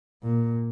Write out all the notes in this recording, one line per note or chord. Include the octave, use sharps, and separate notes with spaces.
A#2